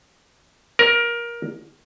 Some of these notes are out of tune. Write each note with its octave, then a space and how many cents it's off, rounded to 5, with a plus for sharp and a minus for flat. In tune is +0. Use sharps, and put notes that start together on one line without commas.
A#4 +20